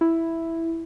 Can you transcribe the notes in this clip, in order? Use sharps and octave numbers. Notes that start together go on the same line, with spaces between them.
E4